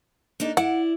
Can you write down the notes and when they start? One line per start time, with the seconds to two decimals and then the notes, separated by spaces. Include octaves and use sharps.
0.40 A#3 D4 D#4
0.57 E4 D5 F#5